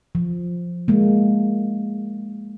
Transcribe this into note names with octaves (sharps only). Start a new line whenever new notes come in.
F3
G#3 A#3